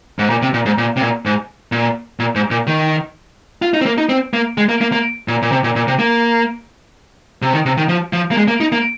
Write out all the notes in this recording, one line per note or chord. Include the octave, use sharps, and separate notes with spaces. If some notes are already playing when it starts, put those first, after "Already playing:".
G#2
A#2
C3
A#2
G#2
A#2
C3
A#2
G#2
A#2
A#2
G#2
A#2
D#3
F4
D#4
C4
A#3
D#4
C4
A#3
G#3
A#3
A#3
A#3
A#2
A#2
C3
A#2
A#2
C3
A#3
C3
D#3
C3
D#3
F3
F3
A#3
G#3
A#3
D#4
A#3